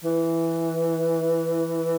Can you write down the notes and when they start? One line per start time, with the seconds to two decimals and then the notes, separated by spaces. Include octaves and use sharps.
0.04 E3